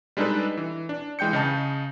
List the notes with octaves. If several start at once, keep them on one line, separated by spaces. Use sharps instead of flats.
G3 G#3 D4 D#4 A4 B4
E3
D4
E3 G#3 G5 G6 C#7
C#3 D#5 A5